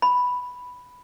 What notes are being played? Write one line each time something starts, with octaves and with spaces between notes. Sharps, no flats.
B5